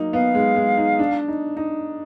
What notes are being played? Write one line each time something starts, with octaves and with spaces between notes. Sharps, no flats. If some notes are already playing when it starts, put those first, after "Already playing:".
Already playing: F#3 A#3 D#4
B3 F5
G#3
G#3
D#4
D4
D#4
D#4